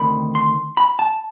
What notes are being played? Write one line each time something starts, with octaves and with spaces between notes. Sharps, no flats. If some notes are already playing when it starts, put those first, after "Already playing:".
Already playing: D2 C3 D#3 B5
C6
B5
A5